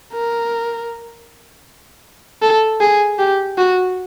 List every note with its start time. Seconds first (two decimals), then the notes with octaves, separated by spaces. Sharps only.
0.13 A#4
2.42 A4
2.81 G#4
3.19 G4
3.58 F#4